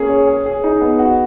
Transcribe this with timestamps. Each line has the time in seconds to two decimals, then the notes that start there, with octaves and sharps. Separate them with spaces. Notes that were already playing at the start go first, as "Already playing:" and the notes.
Already playing: A#3 C#4 G#4
0.10 C#5
0.27 G#4
0.46 G#4
0.64 D#4
0.81 B3
0.99 F#4